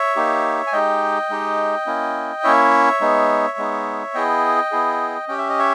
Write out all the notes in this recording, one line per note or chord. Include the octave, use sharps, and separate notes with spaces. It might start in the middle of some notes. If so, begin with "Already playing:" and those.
Already playing: C#5 E5
A#3 D#4 G4
G#5
G#3 D#4 G4 D#5 G5
G#3 D#4 G4
A#3 C#4 E4
A#3 C#4 E4 C#5 E5
G#3 B3 D#4
G#3 B3 D#4
B3 E4 G#4 D#5 G5
B3 E4 G#4
C#4 G4 G5
E5
D#5
C#5 E5